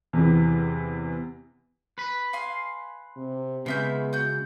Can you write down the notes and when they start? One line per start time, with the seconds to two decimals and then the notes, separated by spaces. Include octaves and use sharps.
0.13 E2 C3 E3
1.98 B4 B5
2.33 F5 G#5 C6
3.17 C3
3.66 C#3 G#3 B3 F4 E5 G6
4.13 F#4 G6